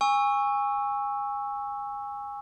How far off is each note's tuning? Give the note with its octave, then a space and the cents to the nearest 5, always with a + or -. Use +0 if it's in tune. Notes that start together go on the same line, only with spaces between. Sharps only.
G#5 -25 C#6 +0 E6 +0